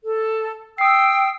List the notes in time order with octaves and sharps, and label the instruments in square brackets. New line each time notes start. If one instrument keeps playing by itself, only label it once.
[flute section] A4
[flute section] G5 E6 [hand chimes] D#6 C7